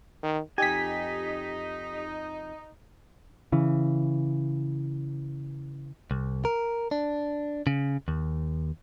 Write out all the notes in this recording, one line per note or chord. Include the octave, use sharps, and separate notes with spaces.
D#3
F2 D#4 G4 G#5 B6
C#3 E3
C2
A#4
D4
C#3
D#2